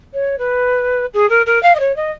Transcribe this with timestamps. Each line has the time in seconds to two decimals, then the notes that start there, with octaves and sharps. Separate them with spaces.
0.13 C#5
0.38 B4
1.13 G#4
1.29 A#4
1.46 A#4
1.62 F5
1.75 D#5
1.79 C#5
1.96 D#5